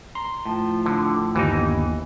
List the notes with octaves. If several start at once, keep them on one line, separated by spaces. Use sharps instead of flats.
A#5 C6
A2 F3
D3
G1 D#2 E3 D#4